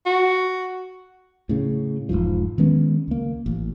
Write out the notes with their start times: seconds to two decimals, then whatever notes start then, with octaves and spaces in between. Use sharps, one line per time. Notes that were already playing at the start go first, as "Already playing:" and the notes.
0.06 F#4
1.49 A2 C#3
2.09 E1 A#1 G#2 F3
2.58 D#3 G#3 B3 C#4
3.08 C#2 A#3
3.46 A1